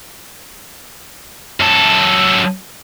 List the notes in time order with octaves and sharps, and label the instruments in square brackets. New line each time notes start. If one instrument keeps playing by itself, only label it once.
[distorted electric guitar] F#2 A4